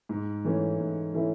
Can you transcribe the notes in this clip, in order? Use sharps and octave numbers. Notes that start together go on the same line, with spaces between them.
G#2
E3 A3 C#4 E4
G#2
E3 A3 C#4 E4